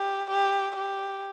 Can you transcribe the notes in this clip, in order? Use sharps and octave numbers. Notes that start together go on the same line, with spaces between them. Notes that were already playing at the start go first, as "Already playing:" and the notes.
Already playing: G4
G4
G4